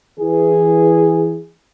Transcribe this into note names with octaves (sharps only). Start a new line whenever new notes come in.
E3 G#4